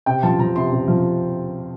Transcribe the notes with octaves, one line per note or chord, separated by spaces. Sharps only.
C3 G5
F3 A5
F3 A#5
C3 C6
C3
F3